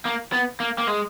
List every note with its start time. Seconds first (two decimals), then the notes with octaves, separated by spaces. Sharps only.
0.05 A#3
0.32 B3
0.60 A#3
0.78 A#3
0.87 G#3